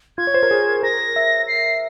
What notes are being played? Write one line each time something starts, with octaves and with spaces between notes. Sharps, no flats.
F4 G#6
C#5
C5
A#4
G#4
A#4 A#6
E5
C7